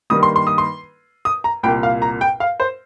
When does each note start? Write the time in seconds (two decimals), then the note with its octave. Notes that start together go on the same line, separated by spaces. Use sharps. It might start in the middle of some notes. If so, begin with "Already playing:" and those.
0.10 G2 D#3 G3 A#3 D#6
0.23 C6
0.36 C6
0.47 D#6
0.58 C6
1.25 D#6
1.44 A#5
1.63 C2 A#2 A#3 G5
1.83 F5
2.02 A#5
2.21 G5
2.40 F5
2.60 C5